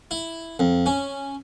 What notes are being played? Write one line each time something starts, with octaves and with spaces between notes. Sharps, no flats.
E4
F2
C#4